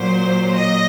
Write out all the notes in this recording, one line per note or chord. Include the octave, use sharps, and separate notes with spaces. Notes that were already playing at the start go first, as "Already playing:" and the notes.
Already playing: A#2 F#3 C5
D#5